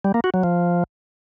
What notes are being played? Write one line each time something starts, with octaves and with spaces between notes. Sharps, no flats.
G3
A#3
F#4
F#3
F3